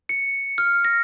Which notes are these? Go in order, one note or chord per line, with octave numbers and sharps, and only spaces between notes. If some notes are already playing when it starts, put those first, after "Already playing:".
C#7
F6
A#6